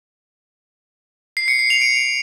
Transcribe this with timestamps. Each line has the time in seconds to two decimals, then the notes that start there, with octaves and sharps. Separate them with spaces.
1.37 C7
1.48 C#7
1.59 C7
1.70 F7
1.81 D7